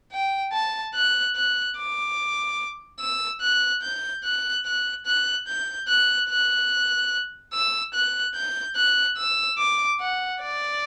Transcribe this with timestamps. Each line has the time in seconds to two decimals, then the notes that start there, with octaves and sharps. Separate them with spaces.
0.12 G5
0.53 A5
0.95 F#6
1.36 F#6
1.77 D6
3.00 E6
3.41 F#6
3.82 G6
4.24 F#6
4.65 F#6
5.06 F#6
5.48 G6
5.88 F#6
6.29 F#6
7.53 E6
7.94 F#6
8.35 G6
8.76 F#6
9.17 E6
9.58 D6
10.00 F#5
10.42 D5